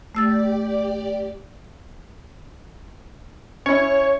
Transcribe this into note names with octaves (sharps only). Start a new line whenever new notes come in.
A3 G4 D5 E6 A6
C#4 E4 C#5